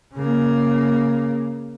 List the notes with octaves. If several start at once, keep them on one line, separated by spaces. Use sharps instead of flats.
C#3 A#3